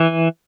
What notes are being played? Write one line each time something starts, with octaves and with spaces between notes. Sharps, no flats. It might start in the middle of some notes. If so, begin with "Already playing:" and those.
Already playing: E3